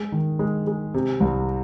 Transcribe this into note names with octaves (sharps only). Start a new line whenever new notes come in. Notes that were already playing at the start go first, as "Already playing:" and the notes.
Already playing: G#3
D#3
G#3
G#3
C3
C2